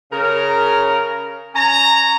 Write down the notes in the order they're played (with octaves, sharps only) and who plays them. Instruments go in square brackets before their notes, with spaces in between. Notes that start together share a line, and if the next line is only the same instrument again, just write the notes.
[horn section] C#3 A#4
C#4 G#5 A#5